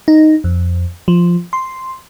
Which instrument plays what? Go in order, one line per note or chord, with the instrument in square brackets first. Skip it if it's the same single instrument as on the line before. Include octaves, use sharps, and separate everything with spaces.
[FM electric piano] D#4
F2
F3
C6